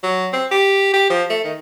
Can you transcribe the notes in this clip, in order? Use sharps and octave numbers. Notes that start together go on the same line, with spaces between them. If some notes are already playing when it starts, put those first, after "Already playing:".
F#3
C4
G4
G4
F3
A3
D#3